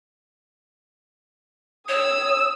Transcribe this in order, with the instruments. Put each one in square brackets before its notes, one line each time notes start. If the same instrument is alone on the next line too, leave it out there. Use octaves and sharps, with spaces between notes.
[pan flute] C#5 [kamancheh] D#6 E6